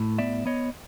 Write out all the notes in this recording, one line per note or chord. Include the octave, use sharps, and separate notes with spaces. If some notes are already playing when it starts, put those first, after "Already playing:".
Already playing: A2
B3 D5 E5
B3 C#5 D#5